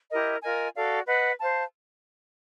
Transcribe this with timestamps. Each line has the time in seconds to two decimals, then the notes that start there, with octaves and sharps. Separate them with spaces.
0.11 E4 G4 A#4 D#5
0.43 F4 A#4 D#5 G#5
0.74 F#4 A4 D5 F5
1.07 B4 D#5 F#5
1.39 C5 F5 A5